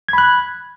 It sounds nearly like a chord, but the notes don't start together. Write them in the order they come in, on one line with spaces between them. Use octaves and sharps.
G#6 B5 F#6